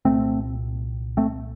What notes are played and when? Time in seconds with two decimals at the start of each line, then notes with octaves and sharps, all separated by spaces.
0.05 C2 A#2 A3 C4
1.17 A3 C4